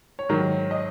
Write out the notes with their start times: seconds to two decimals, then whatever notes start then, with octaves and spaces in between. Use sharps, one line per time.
0.19 C#5
0.29 G#2 D#3 F#3 A#4
0.71 D#5